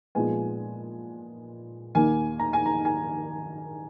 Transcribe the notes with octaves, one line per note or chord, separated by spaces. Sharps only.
A#2 F3 G#3 B3 G#5
D#2 D#3 A#3 G#5
A#5
G#5
A#5
G#5